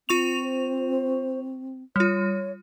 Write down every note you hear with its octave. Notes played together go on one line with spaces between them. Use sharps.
C4 F4 C#6 F7
C5
G3 F4 C#5